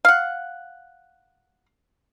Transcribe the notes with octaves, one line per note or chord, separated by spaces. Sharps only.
F5 F#5